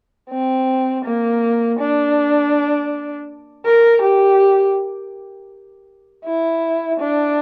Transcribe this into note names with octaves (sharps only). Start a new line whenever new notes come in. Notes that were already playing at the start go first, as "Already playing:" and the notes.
C4
A#3
D4
A#4
G4
E4
D4